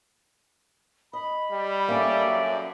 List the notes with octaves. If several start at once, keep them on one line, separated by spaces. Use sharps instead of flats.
D#5 B5
G3
A#3 C#4 A4 D5 E5
F#2